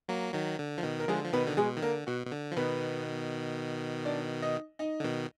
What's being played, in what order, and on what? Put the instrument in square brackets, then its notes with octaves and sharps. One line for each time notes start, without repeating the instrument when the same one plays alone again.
[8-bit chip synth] F#3 A#3
D#3 F#3
D3
F3
B2 D#3
[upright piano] A#4
[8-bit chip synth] D3 F3 [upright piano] G#3 G#4
[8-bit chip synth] F3
[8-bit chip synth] B2 D#3 [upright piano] B3 B4
[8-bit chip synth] D3
[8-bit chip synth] B2 [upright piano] G#3 G#4
[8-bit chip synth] D#3
[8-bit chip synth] D3 [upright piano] A#3 A#4
[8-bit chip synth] B2 [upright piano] F#4
[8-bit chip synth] B2
D3
F3
[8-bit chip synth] B2 D#3 [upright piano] B3 B4
[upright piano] D4 D5
D#4 D#5
D#4 D#5
[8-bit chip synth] D3
B2 D#3